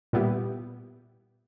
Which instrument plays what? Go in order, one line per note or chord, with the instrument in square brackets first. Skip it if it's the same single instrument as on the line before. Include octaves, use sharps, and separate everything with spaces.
[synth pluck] A#2 G3 B3 E4 G4